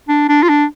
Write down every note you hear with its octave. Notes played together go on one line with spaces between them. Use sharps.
D4
D4
F4
D4